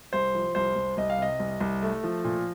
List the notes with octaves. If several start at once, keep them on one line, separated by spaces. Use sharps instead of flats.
C2 C5
F3
C2 C5
C2
C2 D#5
F5
C3 D#5
C2
C2
A3
F3
A#2